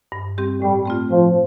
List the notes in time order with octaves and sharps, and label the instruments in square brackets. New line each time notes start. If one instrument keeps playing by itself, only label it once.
[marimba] G2
G3 C4 G4
[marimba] A2 [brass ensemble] G3
[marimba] A3 C4 F4
[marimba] A2 [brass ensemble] F3